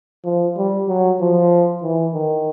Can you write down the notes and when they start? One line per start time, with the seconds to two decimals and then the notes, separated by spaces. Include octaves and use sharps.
0.25 F3
0.57 G3
0.88 F#3
1.21 F3
1.83 E3
2.14 D#3